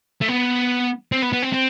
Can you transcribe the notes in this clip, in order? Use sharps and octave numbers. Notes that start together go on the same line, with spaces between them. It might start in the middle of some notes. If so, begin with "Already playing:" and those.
A3
B3
C4
B3
B3
C4
C4